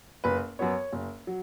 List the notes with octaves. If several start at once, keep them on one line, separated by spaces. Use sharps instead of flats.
F#1 B4
F#2 F#3 B3 C#5
F#1
F#3